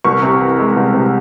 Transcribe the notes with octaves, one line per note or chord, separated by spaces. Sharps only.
C2 C#6
C3
E3
G#3
C2
C3